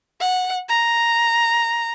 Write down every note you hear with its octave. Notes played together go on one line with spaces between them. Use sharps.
F#5
A#5